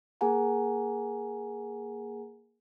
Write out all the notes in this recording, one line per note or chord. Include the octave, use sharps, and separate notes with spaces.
A#3 G#4 A#4 F#5 G#5 A#5